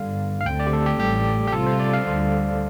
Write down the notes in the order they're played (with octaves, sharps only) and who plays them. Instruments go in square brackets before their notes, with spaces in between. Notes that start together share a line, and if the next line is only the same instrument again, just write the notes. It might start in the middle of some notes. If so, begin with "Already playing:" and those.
Already playing: [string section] G1 G2 D3 [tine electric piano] F5
[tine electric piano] F5
[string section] D2 D3 A3 C4 [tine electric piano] G5
[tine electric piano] D5
G4
A4
G4
[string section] A1 A2 G3 [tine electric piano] G4
[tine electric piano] G4
[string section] C3 G3 F4 [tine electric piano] A4
[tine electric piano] C5
D5
F5
[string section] D2 D3 G3